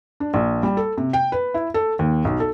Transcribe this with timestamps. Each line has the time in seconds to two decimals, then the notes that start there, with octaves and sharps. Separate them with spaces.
0.20 D4
0.34 A#1
0.63 G3
0.77 A4
0.97 C3
1.13 G5
1.32 B4
1.54 E4
1.74 A4
1.99 D#2
2.25 B1
2.40 A4